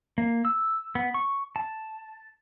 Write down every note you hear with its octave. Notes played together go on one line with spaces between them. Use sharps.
A#3
E6
B3
C#6
A5